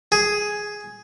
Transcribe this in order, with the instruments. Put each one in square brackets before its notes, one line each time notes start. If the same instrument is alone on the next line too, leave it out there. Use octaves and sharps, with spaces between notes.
[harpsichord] G#4